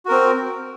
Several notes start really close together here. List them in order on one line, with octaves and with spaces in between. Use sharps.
F#4 A#4 C4